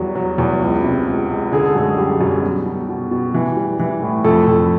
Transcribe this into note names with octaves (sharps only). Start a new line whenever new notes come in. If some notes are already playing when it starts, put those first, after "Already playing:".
Already playing: E2 F#3 G3
F#3
E2
C#2
C3
C#2
C#2
D3 G#4
A4
F#2 G#3 G#4
G3 G4
F#2
B2
B2
B2
B2
E3
G3
E3
A2
F2 A3 A4
F2